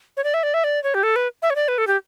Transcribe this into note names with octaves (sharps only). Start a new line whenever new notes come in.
C#5
D5
E5
D5
E5
D5
C#5
G4
A4
B4
E5
C#5
D5
B4
A4
G4